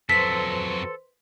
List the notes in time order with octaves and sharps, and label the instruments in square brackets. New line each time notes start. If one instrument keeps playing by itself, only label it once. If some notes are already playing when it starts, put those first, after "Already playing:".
[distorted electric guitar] F2 F#3 [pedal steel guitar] A4 [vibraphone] B4 C5 C6 [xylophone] B6